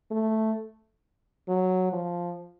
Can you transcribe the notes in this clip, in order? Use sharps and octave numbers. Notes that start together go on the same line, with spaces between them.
A3
F#3
F3